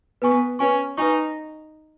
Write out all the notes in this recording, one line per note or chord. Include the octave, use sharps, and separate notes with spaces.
B3 B4 G#5 C#6
C#4 B4 G#5 C#6
D#4 B4 G#5 C#6